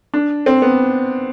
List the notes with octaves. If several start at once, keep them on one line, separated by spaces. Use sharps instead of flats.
D4
C4
B3